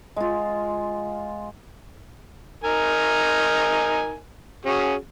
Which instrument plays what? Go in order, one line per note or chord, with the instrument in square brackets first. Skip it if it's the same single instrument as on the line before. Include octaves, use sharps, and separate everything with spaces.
[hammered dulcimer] G#3 F4
[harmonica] D#4 A#4 G#5
C#4 F#4 G#4